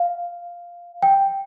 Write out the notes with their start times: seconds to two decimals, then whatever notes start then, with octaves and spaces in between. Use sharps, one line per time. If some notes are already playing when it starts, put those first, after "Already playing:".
Already playing: F5
1.02 G5